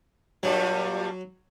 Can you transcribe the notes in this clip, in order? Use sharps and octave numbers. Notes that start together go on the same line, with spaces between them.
G2 A#2 F#3 G3